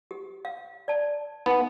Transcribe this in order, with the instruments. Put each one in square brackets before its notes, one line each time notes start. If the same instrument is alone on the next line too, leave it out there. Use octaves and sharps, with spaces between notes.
[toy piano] G4
F5
D5 A5
[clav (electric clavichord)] B3 [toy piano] D#4